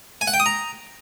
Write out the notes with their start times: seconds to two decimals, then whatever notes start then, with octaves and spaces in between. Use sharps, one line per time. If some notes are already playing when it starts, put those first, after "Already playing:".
0.21 G#5
0.27 F#5
0.34 G5
0.40 D#6
0.46 A#5